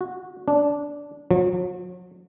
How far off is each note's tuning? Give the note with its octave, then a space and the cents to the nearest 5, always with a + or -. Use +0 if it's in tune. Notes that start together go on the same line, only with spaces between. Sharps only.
F#4 -15
D4 -15
F#3 -45